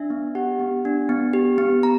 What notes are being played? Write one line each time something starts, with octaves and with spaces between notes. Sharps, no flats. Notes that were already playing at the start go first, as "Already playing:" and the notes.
Already playing: D4 E5
B3
G4 F#5
B3
D4
B3
G4
B3
A#5